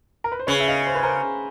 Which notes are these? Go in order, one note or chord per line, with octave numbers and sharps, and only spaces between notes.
A#4
B4
C5
C#3 B4 C#5
E5
D#5 F5
C5
B4
A#4 C5